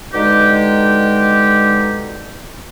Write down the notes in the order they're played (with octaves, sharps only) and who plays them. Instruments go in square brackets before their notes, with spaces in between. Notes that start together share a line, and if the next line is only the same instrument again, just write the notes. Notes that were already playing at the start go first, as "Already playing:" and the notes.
[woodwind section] B2 D3 G#3 D#4 G4